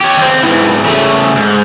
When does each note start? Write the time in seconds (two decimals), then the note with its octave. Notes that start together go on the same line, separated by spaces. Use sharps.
0.01 G4 C#5
0.17 D#2 C4
0.43 G#2 E3
0.86 C#3 A3
1.37 G#2